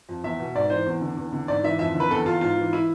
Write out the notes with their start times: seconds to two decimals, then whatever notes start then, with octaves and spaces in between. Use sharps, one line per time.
0.09 F2
0.24 E2 E5
0.40 B2
0.55 G#2 D5
0.70 E3 C5
0.86 E2
1.01 D3
1.17 E2
1.33 D3
1.48 G#2 D5
1.63 E3 E5
1.79 F2 E5
1.94 D3
2.00 B4
2.10 E2 A4
2.25 E2 F4
2.41 G#2 F4
2.57 E3
2.73 E4